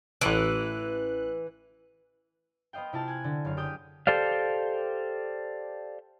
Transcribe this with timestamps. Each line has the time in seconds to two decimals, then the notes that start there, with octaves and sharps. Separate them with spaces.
0.21 A1 E3 F#6
2.73 B3 C5 D#5 F5 G5
2.93 C3 E4 F4 A5 F6
3.08 G#5 F#6
3.24 D3
3.45 F#1 F5
3.57 G4 D#6 G6
4.07 G4 A4 C5 D5 F5